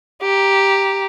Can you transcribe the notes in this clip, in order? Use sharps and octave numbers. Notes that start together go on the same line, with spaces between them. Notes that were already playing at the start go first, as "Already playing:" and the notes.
G4 A#5